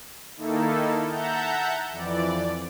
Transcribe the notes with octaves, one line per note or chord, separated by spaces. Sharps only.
D#3 A#3 D#4 E4 A4
E5 F#5 A5 A#5 G6
F2 E3 D5